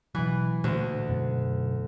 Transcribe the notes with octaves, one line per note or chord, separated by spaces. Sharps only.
B2 E3 F#3
D2 A#2
F#2 B2